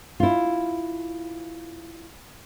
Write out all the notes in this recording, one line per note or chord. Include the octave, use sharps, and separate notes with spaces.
E4 F4